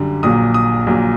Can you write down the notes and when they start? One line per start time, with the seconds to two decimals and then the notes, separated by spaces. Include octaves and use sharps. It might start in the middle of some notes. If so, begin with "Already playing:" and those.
Already playing: F#2 D3 G3
0.23 A#1 A#2 F#3 D#6
0.54 D#6
0.87 A#1 A#2 F#3